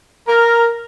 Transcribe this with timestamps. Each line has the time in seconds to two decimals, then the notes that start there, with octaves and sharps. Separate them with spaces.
0.28 A#4 A#5